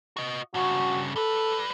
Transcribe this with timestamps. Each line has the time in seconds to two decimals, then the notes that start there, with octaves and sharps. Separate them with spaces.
0.17 F#4 D#5
0.54 G2 C#3 F#4
1.16 G3 A4 B4